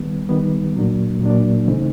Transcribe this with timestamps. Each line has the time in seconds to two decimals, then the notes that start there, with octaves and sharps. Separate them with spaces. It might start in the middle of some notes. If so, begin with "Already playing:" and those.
Already playing: D#3 G3 B3
0.29 D#3 G3 B3
0.75 A#2 F#3 A#3 D4
1.21 A#2 F#3 A#3 D4
1.68 C#3 E3 A3 C4 D#4